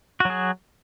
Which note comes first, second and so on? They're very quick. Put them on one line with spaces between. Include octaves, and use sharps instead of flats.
F#4 F#3 G#4